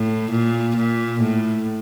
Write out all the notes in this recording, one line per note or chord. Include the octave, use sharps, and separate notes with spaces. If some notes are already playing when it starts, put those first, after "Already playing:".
Already playing: A2
A#2
A#2
A2